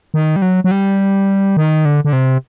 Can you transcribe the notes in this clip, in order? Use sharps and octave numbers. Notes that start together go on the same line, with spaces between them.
D#3
G3
F#3
F#3
G3
D#3
D3
D3
C3